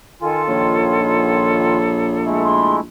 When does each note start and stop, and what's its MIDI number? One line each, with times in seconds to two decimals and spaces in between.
0.22 1.77 51
0.22 1.77 65
0.22 2.50 69
0.22 0.42 80
0.48 2.87 34
0.48 2.18 73
2.25 2.80 56
2.25 2.80 57
2.25 2.80 64
2.44 2.76 84